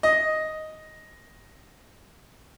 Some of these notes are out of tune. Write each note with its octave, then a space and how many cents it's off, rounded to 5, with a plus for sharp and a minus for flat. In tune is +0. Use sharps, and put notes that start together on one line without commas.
D#5 +5